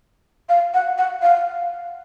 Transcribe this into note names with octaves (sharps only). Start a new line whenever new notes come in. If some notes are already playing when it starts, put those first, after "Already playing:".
F5
F#5
F#5
F5